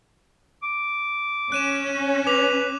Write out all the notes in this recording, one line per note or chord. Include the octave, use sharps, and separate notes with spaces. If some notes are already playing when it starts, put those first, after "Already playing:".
D6
C#4 F#6 D#7 E7
B4 D6 F7